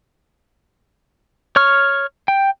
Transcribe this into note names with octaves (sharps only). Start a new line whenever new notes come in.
C#5 C#6 F6
G5